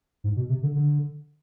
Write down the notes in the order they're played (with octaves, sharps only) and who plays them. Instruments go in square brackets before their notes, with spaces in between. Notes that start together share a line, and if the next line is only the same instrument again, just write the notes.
[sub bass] G#2
B2
C3
D3
D3